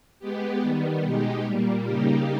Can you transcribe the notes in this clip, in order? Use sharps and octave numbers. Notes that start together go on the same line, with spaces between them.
G#3 B3 G4
D#3 G3 B3
B2 G#3 D#4 G4
A#2 G3 A#3
C#3 G3 A#3 D#4 G4